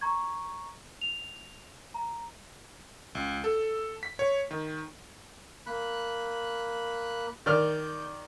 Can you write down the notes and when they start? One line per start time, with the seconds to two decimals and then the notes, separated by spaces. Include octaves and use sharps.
0.01 A#5 C#6 G#6
1.01 F7
1.94 A#5
3.15 C#2
3.44 A4
4.03 B6
4.19 C#5
4.51 D#3
5.67 A#3 B5 F#6
7.46 D#3 D5 F6 G6